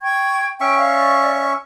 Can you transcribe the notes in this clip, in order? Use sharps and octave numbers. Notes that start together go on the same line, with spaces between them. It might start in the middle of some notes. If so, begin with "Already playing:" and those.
G5 C#6 G#6
C#4 E5 G5 C#6
D5 F5